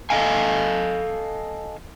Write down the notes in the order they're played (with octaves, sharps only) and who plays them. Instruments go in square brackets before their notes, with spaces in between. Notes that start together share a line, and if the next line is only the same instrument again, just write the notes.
[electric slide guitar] A4 C5 D#5 F5 G#5